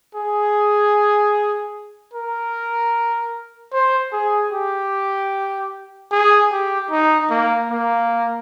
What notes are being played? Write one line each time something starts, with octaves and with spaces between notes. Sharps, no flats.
G#4
A#4
C5
G#4
G4
G#4
G4
D#4
A#3
A#3